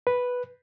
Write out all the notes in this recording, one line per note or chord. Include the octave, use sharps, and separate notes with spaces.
B4